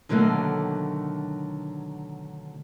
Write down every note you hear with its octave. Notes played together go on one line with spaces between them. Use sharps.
B2 D3 D#3 F#3 A3 A#3